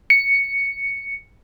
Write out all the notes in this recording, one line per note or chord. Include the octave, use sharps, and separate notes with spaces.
C#7